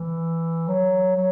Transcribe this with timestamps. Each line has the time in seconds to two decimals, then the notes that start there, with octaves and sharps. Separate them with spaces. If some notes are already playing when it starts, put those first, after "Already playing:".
Already playing: E3
0.68 F#3
1.15 F#3